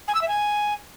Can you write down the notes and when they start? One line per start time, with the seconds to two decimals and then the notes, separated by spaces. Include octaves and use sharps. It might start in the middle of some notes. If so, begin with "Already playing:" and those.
0.08 G#5
0.15 E6
0.22 E5
0.28 G#5